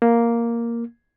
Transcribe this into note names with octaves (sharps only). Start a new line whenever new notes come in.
A#3